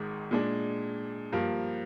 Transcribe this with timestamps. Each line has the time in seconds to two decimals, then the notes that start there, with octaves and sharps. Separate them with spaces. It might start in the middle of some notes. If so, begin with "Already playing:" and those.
Already playing: G#1 G#2 D#3 G#3
0.31 A#2 G#3 D4
1.32 G2 F3 A#3